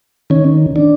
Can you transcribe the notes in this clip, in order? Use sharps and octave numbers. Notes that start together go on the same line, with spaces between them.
D#3 C#4
D4